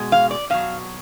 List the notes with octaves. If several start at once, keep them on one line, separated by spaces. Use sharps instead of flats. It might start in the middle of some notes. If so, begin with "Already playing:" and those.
Already playing: B2 G#3
F5
D5
B2 F#3 F5